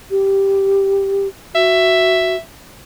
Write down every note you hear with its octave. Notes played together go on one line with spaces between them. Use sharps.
G4
F#4 E5